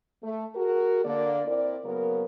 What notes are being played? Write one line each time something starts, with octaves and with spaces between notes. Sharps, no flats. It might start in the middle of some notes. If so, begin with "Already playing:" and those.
A3
F#4 G#4 A#4
D3 A#3 D5
C4 E4 A#4 D5
C#3 F#3 A#3 B3 A#4